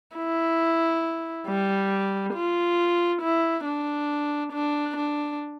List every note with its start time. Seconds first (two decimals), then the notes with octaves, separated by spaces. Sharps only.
0.16 E4
1.47 G3
2.34 F4
3.21 E4
3.65 D4
4.52 D4
4.96 D4